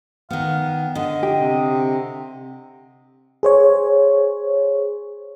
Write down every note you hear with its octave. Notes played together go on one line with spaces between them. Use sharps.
D#3 B3 F5
D3 D#5
G4
C3
G#4 C5 C#5